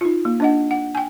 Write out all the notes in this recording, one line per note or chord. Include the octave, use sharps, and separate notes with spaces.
D#4 F4
A#3
D4 D#5 F#5
F#5
G5 G#5